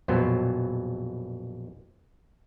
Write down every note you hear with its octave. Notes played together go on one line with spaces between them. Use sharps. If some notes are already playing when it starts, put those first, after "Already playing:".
A#1 F2 B2 F#3 B3 C5